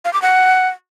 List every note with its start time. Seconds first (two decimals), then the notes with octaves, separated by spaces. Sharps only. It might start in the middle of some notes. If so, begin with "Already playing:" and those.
0.05 F5
0.13 D6
0.22 F#5